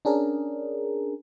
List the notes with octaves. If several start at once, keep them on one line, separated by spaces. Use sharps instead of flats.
C#4 D4 G#4 A#4